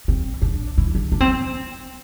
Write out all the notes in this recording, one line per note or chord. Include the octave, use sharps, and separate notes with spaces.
C4
D4
E4
D4
D4
C4